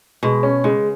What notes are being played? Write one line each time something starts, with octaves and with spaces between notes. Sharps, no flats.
B2 G#3
C#4
C#3 G#3